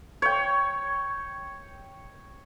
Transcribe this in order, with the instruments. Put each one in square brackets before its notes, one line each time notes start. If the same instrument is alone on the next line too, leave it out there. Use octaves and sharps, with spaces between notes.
[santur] C#5 G5